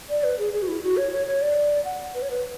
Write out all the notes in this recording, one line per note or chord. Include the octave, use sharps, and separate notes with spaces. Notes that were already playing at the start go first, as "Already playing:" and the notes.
D5
B4
G#4
G#4
F#4
E4
F#4
C#5
C#5
C#5
D5
F#5
B4
C#5
B4